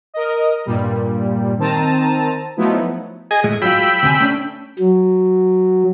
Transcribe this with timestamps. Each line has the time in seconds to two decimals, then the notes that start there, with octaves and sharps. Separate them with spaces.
0.14 A#4 D#5
0.65 G2 A#2 G3
1.58 D#3 C4 A5 A#5 D#7
2.57 F3 F#3 A3 B3 D#4 E4
3.31 G#4 D#5 G#5
3.44 A2 G#3
3.62 F#3 G#3 F4 G5 B5 E6
4.03 D2 C3 G#5
4.20 A3 C#4 D4
4.79 F#3